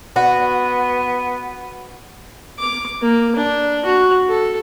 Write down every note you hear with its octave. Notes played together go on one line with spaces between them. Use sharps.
B3 F#4
D6
A#3
D4
F#4
A4